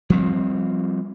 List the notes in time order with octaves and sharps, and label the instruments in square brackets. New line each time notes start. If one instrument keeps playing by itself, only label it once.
[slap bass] F3 G3 C4